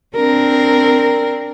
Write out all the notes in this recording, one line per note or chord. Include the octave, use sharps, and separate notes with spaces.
C4 D4 A#4